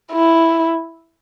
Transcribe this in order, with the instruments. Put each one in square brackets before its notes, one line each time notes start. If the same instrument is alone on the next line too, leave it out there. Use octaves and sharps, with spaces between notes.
[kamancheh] E4